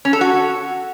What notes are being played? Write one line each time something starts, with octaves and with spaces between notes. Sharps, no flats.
C#4
A4
F#4